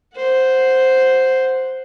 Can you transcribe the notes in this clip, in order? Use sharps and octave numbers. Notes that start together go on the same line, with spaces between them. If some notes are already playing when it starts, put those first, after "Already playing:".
C5 F#5